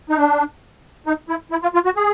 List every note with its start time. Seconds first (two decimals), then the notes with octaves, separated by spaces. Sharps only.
0.10 D#4
0.17 D4
1.06 D#4
1.29 E4
1.51 E4
1.63 F4
1.74 F4
1.85 F#4
1.96 G#4